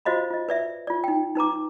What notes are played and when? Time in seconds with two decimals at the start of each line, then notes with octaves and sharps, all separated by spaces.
0.05 F4 F#4 C5 D#5 F5 B5
0.30 F4 D#5
0.49 B4 D5 E5
0.87 F4 D5
1.04 D#4 G5
1.35 D#4 B4 A#5 D6